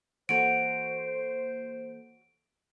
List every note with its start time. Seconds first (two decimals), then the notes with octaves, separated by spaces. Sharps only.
0.29 E3 A#3 F#4 A4 C5 C#5 D7